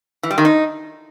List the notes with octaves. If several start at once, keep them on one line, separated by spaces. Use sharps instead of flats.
E3
G3
D#3
D#4